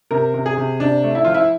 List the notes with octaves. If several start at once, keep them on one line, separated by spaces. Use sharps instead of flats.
C3 A#4
C3
G#4
C3
C3 D4
A3
E4
F3 F4
E4